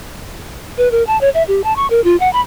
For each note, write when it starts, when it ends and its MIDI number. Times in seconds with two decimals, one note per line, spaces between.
0.77 0.91 71
0.91 1.03 70
1.07 1.19 81
1.21 1.29 73
1.34 1.43 76
1.48 1.61 67
1.64 1.75 81
1.76 1.87 85
1.90 2.03 70
2.04 2.16 65
2.20 2.31 78
2.33 2.41 83